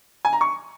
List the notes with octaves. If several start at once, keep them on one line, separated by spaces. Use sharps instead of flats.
G#5
A#5
C#6